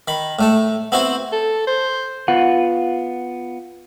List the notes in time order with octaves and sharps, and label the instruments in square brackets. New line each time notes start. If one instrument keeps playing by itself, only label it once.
[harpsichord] D#3 B5
A2 A3 A5
B3 C4 E4 F#4 C5
[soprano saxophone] A4
C5
[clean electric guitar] B3 F4 F#5